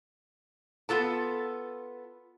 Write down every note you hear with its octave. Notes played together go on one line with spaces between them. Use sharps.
B3 F4 A4 A5